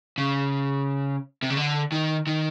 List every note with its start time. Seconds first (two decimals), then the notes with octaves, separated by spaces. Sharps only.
0.18 C#3
1.43 C3
1.50 C#3
1.57 D3
1.92 D#3
2.27 D#3